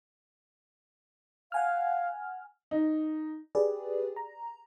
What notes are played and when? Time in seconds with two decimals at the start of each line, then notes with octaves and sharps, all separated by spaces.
1.52 F5 F#5 G#5 F6
2.71 D#4
3.55 G4 G#4 B4 D5
4.16 A#5